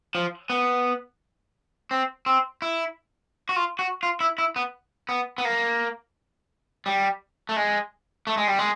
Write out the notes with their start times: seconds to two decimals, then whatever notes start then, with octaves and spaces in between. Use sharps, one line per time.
0.15 F3
0.50 B3
1.91 C4
2.26 C4
2.62 E4
3.49 F#4
3.56 F4
3.79 F#4
4.03 F4
4.20 E4
4.38 E4
4.56 B3
5.09 B3
5.38 B3
5.45 A#3
6.86 G3
7.49 A3
7.56 G#3
8.27 A3
8.37 G#3
8.47 G3
8.59 G#3